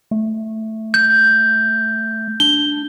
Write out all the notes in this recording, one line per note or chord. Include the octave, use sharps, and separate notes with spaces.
A3
G6
D4 G7